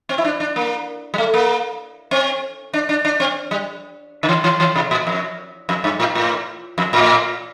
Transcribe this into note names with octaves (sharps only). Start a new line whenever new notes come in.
C4
E4
D4
D4
A#3
G3
A3
A#3
C4
D4
D4
D4
C4
G3
D3
E3
E3
E3
C3
A#2
F2
F2
G2
A2
A2
F2
A2